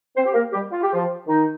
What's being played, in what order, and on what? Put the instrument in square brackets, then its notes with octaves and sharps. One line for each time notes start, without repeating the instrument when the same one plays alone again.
[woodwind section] C4 C5
G4
A#3 A#4
G3 G4
F4
G4
F3 F4
D#3 D#4